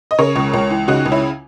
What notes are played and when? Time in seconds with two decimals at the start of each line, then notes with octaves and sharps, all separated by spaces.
0.11 D#5
0.18 C#3 A#4 C#5
0.36 C#2
0.54 C#2
0.70 E3
0.88 C#3 D#4 F#4
1.06 C#2
1.12 C#4 E4